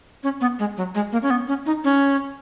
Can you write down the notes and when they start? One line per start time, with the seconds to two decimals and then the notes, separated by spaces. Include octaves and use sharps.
0.23 C#4
0.41 B3
0.59 G#3
0.77 F#3
0.95 G#3
1.12 A#3
1.23 C#4
1.30 B3
1.48 C#4
1.66 D#4
1.84 C#4